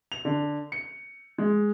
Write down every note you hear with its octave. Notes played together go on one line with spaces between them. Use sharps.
F7
D3
C#7
G#3